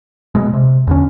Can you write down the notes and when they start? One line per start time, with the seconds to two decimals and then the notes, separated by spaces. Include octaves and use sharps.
0.35 B2 G#3
0.53 C3
0.87 E2 D3 C#4